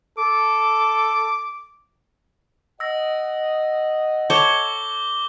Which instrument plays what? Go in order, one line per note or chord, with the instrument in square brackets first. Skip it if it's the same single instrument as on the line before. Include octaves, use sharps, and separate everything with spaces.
[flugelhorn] A4 [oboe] D6
[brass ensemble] D#5 F#5 [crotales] E6 A#6
[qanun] A4 C#5 [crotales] D6 G6 G7